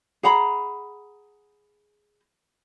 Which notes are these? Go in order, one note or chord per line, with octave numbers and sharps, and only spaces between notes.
G#4 F#5 A#5 B5